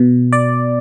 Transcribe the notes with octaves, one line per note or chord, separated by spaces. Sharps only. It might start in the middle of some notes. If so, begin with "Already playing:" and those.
Already playing: B2
D5